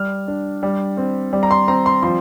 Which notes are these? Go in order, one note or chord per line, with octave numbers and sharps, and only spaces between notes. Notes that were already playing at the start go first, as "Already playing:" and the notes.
Already playing: G3 F6
D4
G3
C4
G3
A#5
C6
C4 A#5
C6
F3 C6